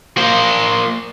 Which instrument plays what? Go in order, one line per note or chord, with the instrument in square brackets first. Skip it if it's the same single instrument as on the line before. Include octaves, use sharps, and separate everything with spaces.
[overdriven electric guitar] A#3 C5